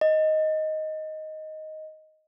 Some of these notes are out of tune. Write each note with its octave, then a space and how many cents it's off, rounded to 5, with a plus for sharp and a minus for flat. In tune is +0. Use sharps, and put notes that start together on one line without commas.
D#5 +5